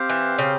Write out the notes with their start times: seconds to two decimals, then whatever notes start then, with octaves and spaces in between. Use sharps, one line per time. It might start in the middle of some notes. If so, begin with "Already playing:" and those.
Already playing: C4 G4 C5 F5
0.09 E3
0.38 C#3